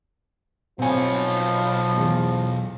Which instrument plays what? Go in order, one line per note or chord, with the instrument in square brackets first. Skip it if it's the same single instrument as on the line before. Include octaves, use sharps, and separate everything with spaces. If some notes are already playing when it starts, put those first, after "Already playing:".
[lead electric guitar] B1 C#5 [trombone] F3 [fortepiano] C4 G#5
[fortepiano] E2